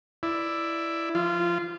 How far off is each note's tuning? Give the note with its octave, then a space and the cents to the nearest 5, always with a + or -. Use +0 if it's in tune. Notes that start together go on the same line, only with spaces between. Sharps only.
E4 +10 D5 +0
F3 +0 F4 -20